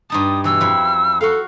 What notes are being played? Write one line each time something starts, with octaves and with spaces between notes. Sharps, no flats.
G2 D#4 A5 D#6
B2 E3 E6
F2 E4
F#4 A4 F5